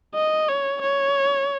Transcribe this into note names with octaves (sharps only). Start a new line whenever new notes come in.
D#5
C#5
C#5